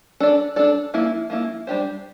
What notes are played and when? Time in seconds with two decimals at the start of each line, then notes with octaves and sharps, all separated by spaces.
0.20 D4 A4 D5
0.56 D4 A4 D5
0.94 F3 A#3 E4
1.30 F3 A#3 E4
1.67 G3 D4 G4 C5